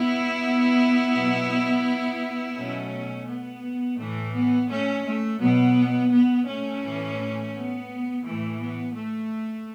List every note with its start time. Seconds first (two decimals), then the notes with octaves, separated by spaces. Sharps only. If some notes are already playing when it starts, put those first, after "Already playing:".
Already playing: B3 E4
1.14 B2 F#3
2.56 B2 F#3 A3 C#4
3.27 B3
3.98 A2 E3 A3
4.34 B3
4.69 A3 C#4
5.05 A3
5.40 B2 F#3 B3
6.12 B3
6.47 A3 C#4
6.82 A2 E3
7.53 B3
8.24 A2 E3 A3
8.60 B3
8.95 A3